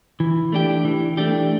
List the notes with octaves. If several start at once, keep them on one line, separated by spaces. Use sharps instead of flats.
E3
A3 D4 G4
E3
A3 D4 G4